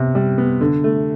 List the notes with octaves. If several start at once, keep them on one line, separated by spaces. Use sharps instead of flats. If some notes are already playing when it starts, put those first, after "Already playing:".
Already playing: C3 B3
G3
B3
D3
A3